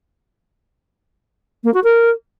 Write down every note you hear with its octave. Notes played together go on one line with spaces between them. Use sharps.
A#3
F#4
A#4